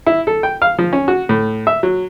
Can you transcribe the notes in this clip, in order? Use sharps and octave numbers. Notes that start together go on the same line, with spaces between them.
E4
A4
G5
F5
F3
C#4
F#4
A2
E5
F#3